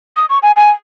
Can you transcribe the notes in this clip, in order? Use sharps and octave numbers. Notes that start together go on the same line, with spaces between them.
D#6
C#6
G#5
G#5